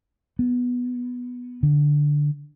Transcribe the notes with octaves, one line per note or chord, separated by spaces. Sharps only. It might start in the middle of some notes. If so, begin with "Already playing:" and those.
B3
D3